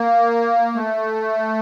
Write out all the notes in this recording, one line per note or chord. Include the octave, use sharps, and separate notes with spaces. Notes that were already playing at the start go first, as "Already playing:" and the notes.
Already playing: A#3
A3